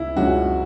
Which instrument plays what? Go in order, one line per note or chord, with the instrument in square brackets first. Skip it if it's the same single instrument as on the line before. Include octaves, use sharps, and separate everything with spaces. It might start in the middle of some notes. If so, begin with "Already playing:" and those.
Already playing: [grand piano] C#2 C#4 [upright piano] E4
[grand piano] C#2 C#3 F#3 C#4 [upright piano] F#4